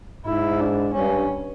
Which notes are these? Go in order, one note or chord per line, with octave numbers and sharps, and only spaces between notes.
G#2 E4
D4
G2 C#4